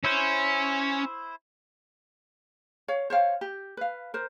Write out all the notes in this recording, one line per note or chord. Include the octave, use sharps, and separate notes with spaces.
C#4 E4 C5
C#5 F5
C5 C#5 F5 G5
G4
B4 F5
A#4 C5